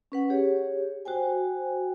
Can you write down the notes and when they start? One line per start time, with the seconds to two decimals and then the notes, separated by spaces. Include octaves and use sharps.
0.12 C#4 B4 F#5
0.30 G4 G#4 C#5
1.05 F#4 C5 G5 G#5